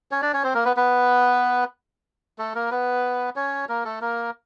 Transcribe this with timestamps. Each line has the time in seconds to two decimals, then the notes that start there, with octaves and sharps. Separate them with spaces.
0.11 C#4 C#5
0.22 D4 D5
0.33 C#4 C#5
0.44 C4 C5
0.54 A#3 A#4
0.65 B3 B4
0.76 B3 B4
2.38 A3 A4
2.55 A#3 A#4
2.71 B3 B4
3.36 C#4 C#5
3.69 A#3 A#4
3.85 A3 A4
4.01 A#3 A#4